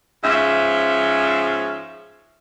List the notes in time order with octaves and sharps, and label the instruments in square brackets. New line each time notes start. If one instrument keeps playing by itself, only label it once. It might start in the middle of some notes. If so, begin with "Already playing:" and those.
[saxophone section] G#2 F3 C#4 E5